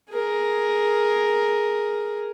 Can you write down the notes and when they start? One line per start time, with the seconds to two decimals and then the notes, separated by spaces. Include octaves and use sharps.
0.10 G#4 A#4